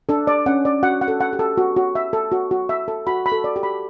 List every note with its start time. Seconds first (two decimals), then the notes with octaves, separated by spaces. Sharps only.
0.09 D4 A4
0.27 D5
0.46 C#4 F#5
0.65 D5
0.83 F#4 F#5
1.01 F#5
1.08 A4
1.20 F#5
1.33 G4
1.39 A4
1.57 F#4
1.76 F#4
1.95 E5
2.13 A4
2.32 F#4
2.51 F#4
2.69 E5
2.88 A4
3.07 F#4 B5
3.26 B5
3.32 A4
3.44 D5
3.56 G4
3.63 B5